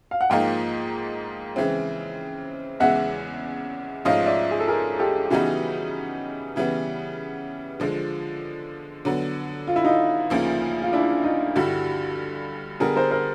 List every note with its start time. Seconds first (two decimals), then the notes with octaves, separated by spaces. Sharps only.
0.11 F5
0.21 F#5
0.30 G#2 F3 A#3 D#4 F5 G5
1.56 C#3 E3 G#3 C4
2.80 E2 C#3 E3 G#3 E5 F#5
4.05 G#2 F3 A3 C#4 D#5 F5
4.26 D5 E5
4.51 G#4
4.60 A4
4.68 G#4 A#4
4.99 G4 A4
5.25 G4
5.30 C#3 E3 G3 B3 D#4 F#4 G#4
6.56 C#3 E3 G3 B3
7.80 D3 F3 G#3
9.05 D3 F#3 B3
9.67 F4
9.76 E4
9.84 D#4 F4
10.30 D2 C#3 F3 A#3
10.82 F4
10.93 D4 E4
11.24 D#4 F4
11.55 G2 D3 G3 E4 F#4
12.80 D3 G3 B3 G#4 A#4
12.96 A#4 C5
13.11 A#4 C5